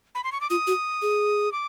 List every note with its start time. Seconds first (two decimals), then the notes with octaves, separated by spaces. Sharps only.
0.15 B5
0.24 C6
0.32 C#6
0.41 D6
0.50 F4 D#6
0.67 F#4
1.02 G#4
1.52 D6